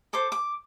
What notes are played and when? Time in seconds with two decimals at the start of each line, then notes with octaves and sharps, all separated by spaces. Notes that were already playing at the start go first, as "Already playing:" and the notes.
0.13 A4 C5 D6
0.32 D6